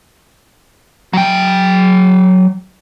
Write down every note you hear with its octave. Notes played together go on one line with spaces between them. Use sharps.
F#3 G5